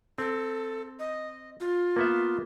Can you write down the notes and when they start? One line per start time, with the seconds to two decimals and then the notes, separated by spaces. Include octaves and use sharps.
0.18 C4 A4
0.99 D#5
1.61 F4
1.96 A#3 B3 E5